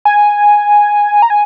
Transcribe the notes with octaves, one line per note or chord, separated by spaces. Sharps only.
G#5
A#5
G#5